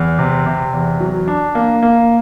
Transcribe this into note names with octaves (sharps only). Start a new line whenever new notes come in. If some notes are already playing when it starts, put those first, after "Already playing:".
Already playing: E2
C3
C3
E2
F#3
D4
A#3
A#3